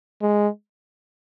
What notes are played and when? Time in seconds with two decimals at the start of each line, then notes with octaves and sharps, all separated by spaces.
0.22 G#3